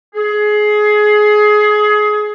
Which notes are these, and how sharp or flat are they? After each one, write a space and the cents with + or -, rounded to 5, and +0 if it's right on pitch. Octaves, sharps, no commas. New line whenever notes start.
G#4 +20